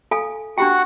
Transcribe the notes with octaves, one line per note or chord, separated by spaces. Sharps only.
A4 F5 G#5
D4 F#4 G4 F#5 G5